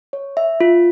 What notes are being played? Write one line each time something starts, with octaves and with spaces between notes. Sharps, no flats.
C#5
E5
F4